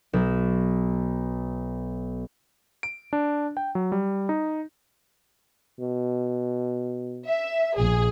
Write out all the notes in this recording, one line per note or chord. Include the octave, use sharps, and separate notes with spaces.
B1 E7
D7
D4
G5
F#3
G3
D#4
B2
E5
A#1 G#4